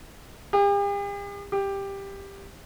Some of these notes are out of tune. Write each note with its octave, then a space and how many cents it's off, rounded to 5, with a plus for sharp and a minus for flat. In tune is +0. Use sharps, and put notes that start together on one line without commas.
G4 +45
G4 +10